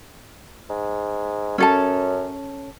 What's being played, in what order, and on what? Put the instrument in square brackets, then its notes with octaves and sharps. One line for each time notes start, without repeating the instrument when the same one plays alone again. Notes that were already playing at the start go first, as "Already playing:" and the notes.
[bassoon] G#2
[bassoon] F#2 [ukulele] C#4 A4 A5